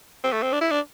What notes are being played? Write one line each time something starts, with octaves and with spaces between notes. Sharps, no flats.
C4
A3
C4
D4
E4
D4